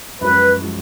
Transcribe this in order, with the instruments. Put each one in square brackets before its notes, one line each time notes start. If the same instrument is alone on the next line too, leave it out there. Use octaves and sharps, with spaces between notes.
[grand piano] F#2 F3 G#3 [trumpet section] B4
[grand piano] F3 G#3